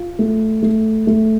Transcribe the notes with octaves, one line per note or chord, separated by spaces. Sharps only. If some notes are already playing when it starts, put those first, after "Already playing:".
Already playing: F4
A3
A3
A3